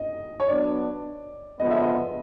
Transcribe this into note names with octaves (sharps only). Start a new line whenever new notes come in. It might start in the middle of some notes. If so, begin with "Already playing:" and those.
Already playing: D#5
C#5
F#3 B3 D4 D5
D3 F3 G#3 B3 D#5
E5
D#5